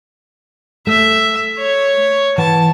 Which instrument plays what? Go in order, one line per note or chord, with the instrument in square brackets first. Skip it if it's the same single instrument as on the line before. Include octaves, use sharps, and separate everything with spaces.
[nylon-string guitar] A3 [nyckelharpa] E5
[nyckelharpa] C#5
[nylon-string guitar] E3 F#5 [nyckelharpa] A5